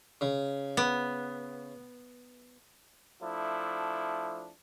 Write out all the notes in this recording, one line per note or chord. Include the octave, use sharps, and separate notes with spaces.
C#3
B3
F3 A3 D4 E4